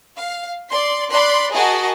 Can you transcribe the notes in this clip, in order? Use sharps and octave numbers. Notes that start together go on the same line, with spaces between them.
F5
D5 C6
D5 B5 C6 F#6
F#4 G#4 A#4 D#5 A5